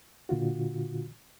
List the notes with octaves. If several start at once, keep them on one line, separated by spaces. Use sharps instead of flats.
A#2 D3 F4 F#4